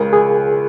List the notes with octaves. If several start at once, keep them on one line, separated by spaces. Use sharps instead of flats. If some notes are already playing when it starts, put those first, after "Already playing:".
Already playing: C#2 C#3 G#3 A#4
G#4